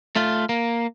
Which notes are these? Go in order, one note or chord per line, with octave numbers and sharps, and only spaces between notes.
A3 F4
A#3